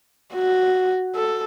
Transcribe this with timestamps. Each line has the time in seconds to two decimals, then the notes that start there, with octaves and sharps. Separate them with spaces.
0.33 F#4
1.16 A4